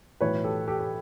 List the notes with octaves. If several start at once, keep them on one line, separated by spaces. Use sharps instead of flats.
B1 A2 E3 B4 C#5
G4 A4
G4 A4
G4